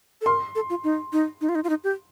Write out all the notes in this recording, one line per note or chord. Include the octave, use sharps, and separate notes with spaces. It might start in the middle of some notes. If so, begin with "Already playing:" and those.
A4
A#4 C6
A4
F4
D#4
D#4
D#4
F4
D#4
F4
D#4
G4